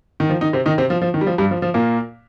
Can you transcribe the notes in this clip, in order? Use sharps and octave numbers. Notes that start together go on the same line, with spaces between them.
D#3
F3
D#3 D#4
C3 C4
D#3 D#4
C3 C4
F3
F3
D#3
G3
F3
G2 G3
F3
F3
A#2 A#3